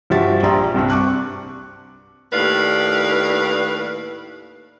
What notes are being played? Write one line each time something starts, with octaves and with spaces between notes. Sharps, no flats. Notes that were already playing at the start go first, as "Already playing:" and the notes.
G2 F3 F#4 G4 E5 A6
A#1 G4 D5 A#5 C6
C2 G2 C4 D4
C#6 D6 F#6
D#2 A2 B4 D5 F5